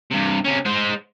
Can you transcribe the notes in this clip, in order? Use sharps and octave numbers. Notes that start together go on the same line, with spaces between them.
G2 C3
C3 C#4
G#3 C5